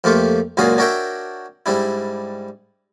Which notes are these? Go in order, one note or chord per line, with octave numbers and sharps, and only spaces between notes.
F2 A3 A#3 F4 G4 C#6
C#2 F#2 A#2 F#4 G#4 F5
D4 F#4 A#4 C#5 E5 G5
G#2 G3 D4 E4